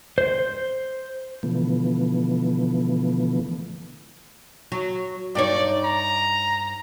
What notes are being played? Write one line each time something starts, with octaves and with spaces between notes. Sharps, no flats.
C5
B2 D3 E3 F3 A3 B3
F#3
G2 D#4 C#5 D5
A#5